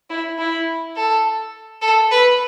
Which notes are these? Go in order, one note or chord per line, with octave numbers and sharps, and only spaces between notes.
E4
E4
A4
A4
B4